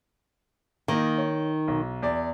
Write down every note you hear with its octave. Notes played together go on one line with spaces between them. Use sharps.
D#3 A#3 D#4
C#5
B1
E2 D5